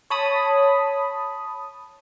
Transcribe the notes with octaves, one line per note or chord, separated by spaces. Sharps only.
C#5 A5 B5 D#6